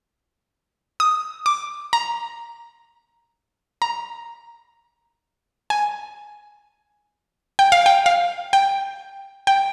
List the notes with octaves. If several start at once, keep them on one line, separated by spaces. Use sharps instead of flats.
D#6
D6
A#5
A#5
G#5
G5
F5
G5
F5
G5
G5